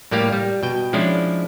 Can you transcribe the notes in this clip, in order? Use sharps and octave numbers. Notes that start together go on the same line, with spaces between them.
A2 G3 A#3 G4 F5
G3
B2 G5
F3 G#3 C#4 D4 E4